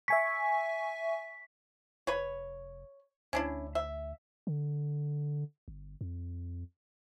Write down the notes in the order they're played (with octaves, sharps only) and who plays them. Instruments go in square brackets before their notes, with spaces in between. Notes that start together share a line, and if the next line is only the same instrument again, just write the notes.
[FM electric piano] E5 G#5 C#6 [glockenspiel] B6
[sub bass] F1 [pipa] B4 C#5
[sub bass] D2 [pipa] C#4 D4 E4
[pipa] E5
[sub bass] D3
G1
F2